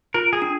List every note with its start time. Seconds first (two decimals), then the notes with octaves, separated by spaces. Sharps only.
0.14 F4 A#4
0.33 G#4
0.42 D4